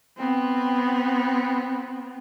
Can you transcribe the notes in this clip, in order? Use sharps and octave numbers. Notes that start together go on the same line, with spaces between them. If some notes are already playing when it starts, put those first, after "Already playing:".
B3 C4